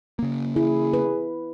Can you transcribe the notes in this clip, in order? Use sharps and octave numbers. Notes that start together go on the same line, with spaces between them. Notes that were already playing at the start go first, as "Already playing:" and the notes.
C#3 A#3
E4 G#4
B4